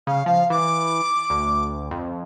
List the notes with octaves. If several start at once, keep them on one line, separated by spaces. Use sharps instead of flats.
C#3 F5
F3 F5
E3 D6
D2
F2